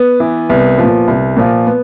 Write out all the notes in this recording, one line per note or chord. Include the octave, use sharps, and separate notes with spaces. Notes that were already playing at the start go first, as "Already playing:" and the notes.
Already playing: B3
E3
C2 B3
A#2 F3
C2
A#2 F3
B3